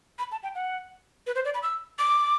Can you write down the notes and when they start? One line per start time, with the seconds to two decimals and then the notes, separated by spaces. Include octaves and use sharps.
0.19 B5
0.32 A5
0.43 G5
0.55 F#5
1.27 B4
1.35 C5
1.45 D5
1.54 B5
1.63 E6
1.99 D6